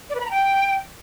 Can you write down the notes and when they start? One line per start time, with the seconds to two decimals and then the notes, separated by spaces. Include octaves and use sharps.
0.10 D5
0.15 B4
0.20 B5
0.26 A#5
0.31 G5